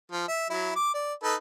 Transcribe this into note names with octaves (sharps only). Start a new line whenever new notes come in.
F3
E5
F#3 E4
D6
D5
D#4 A4 B4